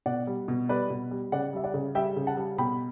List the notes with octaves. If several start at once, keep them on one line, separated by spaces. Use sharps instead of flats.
B2 D5 F#5
G3
B2
G3 B4 D5
B2
G3
C#3 D5 F#5
G3 E5
D5 F#5
C#3
G3 E5 G5
C#3
F#5 A5
G3
B2 G5 B5